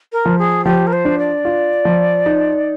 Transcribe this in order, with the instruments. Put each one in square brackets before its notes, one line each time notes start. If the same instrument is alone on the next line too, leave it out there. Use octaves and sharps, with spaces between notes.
[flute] A#4
[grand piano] F3
[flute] G#4
[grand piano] F3 [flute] G4
[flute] A#4
C5
[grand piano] D4
[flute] D5
[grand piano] F4
F3
D#4